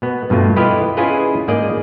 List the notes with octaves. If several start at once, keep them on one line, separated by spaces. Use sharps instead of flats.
B2 B3
G2 B2 A3 F4
E4 F4 G4 B4 D#5 F5
C#4 E4 F4 G#4 B4 D#5
G#2 A#3 G#4 D5 D#5